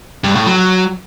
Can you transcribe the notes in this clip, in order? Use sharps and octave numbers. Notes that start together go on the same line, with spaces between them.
G2
A2
F#3